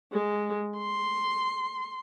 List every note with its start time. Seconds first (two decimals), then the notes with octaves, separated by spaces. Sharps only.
0.13 G#3
0.78 C6